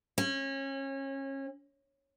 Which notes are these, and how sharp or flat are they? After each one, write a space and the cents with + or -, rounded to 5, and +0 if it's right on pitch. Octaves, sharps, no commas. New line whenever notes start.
C#4 -30